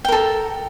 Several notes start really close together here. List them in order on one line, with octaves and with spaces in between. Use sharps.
G5 A#4 A4